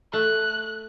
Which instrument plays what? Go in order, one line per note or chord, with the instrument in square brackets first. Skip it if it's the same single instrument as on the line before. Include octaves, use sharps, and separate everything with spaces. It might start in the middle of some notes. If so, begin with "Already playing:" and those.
[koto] A3 [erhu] F#6